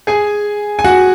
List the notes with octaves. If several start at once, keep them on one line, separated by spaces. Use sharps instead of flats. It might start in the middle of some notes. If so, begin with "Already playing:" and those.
G#4 G#5
G#5
F#4 F#5